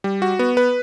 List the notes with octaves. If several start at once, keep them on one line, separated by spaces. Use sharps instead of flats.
G3
F#4
B3
B4